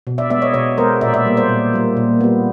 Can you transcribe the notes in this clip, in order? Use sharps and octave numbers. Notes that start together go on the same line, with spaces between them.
B2
D5 E5
G#3 B3 D5 E5
C#5 D#5
B2 C#5 D#5
G#3 B3 A#4 C5
A#2 D5 E5
D5 E5
G3 A#3
C5 D5
A#2
G3 A#3
A#2
G3 B3